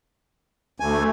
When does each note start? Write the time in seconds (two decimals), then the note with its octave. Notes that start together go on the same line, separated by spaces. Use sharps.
0.80 D2 A3 G#5